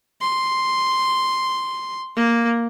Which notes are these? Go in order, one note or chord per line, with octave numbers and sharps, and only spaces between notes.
C6
A#3